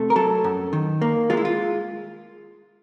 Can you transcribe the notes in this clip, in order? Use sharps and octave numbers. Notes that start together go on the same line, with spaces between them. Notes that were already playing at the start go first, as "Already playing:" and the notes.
Already playing: C3 A3
A#4
F#3 A4
F#2
D#3
A#3
G#3 F4
E4
F4